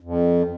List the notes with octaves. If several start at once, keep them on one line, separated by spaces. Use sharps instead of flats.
F2